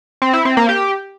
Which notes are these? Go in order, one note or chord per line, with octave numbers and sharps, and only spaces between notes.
C4
E4
C4
A#3
G4